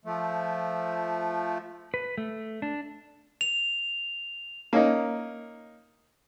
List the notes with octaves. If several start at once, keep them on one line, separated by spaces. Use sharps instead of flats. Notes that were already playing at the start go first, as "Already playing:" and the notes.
F3 A3
B4
A3
D4
F7
A#3 C#4 D#4